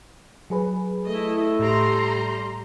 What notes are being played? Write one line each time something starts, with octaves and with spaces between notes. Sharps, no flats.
F#3 G#4 B4
A3 E4 A4 D#5
A2 G3 A#5 C6